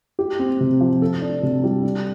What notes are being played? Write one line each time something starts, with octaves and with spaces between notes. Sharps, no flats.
G4
C4
C3
F3
A4
D4
C3
G3
D4